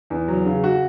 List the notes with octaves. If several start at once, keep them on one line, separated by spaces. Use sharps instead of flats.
E2
F#3
C#3
F#4